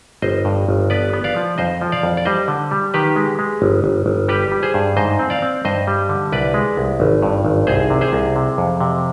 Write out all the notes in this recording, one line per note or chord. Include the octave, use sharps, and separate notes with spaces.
G1 C5 D#5
G2
G1
B3 B4 D5
B3
D5 F5
F3
F2 C5 D#5
F3
D5 F5
F2
D5
G3 C5 D#5
D3
G3
D#3 G4 B4
G#3
G#3
G1
G1
G1
G3 G4 B4
G3
G#4 C5
G2
G#2 C5 D#5
C4
D5 F5
C4
G2 C5 D#5
G3
D3
C2 B4 D5
G#3
C2
G#1
G2
G#1
C2 G#4 C5
C3
G#4 C5
C2
C3
F2
C3